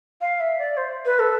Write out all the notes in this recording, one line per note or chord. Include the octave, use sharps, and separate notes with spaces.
F5
E5
D5
C5
B4
A4